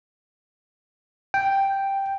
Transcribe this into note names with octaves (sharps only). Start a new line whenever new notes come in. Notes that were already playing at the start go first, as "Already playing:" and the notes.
G5